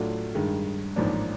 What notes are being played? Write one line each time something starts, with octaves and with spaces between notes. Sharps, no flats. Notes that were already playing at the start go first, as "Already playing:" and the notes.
Already playing: A2 F#3 A3 D4 F4
G2 D#3 G#3
A1 G#2 F3 A#3 D4